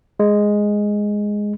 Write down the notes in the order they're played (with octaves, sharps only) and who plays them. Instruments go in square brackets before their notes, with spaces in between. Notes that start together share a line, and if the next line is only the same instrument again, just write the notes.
[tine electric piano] G#3